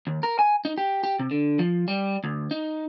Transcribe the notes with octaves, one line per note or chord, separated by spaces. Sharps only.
D#2
A#4
G#5
D#4
G4
G4
C3
D3
F3
G3
D2
D#4